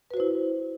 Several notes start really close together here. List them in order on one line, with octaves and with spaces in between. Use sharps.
B4 F#4 C5 E4